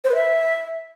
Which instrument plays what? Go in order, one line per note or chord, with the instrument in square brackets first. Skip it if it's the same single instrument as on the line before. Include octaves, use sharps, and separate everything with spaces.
[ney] C5
B4
E5